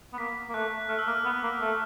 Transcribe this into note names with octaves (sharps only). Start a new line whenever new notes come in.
B3
A#3 B6
A#3
A3 F#6
A3 F6
E6
A#3 F6
B3
A#3
A3